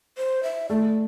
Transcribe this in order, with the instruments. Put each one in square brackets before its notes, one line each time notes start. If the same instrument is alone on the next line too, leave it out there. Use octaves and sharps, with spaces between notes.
[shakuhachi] C5
E5
[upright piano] A3 [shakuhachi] D5